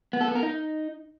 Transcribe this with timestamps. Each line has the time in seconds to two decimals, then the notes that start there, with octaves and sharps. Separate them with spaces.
0.13 B3
0.21 A4
0.28 B3
0.35 A#4
0.43 D#4